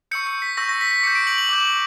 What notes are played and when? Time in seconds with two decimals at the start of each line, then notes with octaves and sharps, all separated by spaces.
0.11 C#6 E6 G6 C#7
0.27 C#7
0.42 B6
0.57 C#6 E6 G6 A#6
0.69 A#6
0.81 B6
0.91 B6
1.03 D6 C#7
1.07 G6
1.15 D7
1.27 F#7
1.38 F#7
1.49 D6 G6